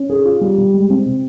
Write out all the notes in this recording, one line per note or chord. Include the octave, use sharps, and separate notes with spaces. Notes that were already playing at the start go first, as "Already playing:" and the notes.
Already playing: C#4
G#4
F4
G3
G3
G#3
C4
C3